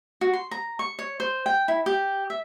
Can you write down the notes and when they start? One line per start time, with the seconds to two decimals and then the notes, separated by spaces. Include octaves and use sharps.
0.21 F#4
0.33 C6
0.51 A#5
0.79 C#6
0.99 C#5
1.20 C5
1.46 G5
1.68 E4
1.86 G4
2.30 E5